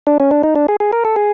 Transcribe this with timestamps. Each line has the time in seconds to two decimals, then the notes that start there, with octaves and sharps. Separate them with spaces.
0.07 D4
0.20 C#4
0.31 D4
0.43 D#4
0.56 D4
0.68 G#4
0.80 G#4
0.93 A#4
1.05 A4
1.16 G#4